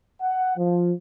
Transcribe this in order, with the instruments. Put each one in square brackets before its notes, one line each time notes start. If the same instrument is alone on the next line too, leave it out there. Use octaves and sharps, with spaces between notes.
[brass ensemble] F#5
F3